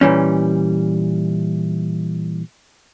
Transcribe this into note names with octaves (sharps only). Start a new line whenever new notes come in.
A#2 E3 G3 C#4